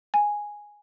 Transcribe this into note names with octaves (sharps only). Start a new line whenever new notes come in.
G#5